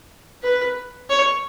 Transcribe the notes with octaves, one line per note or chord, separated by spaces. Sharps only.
B4
C#5